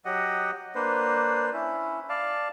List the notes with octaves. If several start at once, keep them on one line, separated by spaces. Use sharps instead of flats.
F#3 G4 D#5 F#5
A#3 D4 B4 C5
C#4 E4
D5 F5 A5